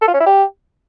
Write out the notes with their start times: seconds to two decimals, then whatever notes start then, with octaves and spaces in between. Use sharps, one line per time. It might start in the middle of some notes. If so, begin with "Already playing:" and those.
0.01 A4
0.07 F4
0.14 C#4
0.20 E4
0.26 G4